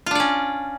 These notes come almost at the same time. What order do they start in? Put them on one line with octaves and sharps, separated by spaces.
F4 D4 D5 C#4